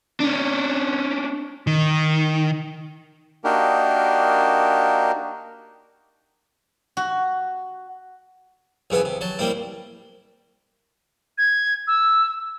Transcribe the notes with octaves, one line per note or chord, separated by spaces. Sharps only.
C#4 D4
D#3
A#3 D4 D#4 F#4 G4 A#4
F#4
C2 C#3 B3 E5 G#5
C3
F#3 A5
G3 A#3 C4 E4
G#6
E6